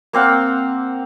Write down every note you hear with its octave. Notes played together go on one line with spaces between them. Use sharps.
A#3 C4 F5 F#5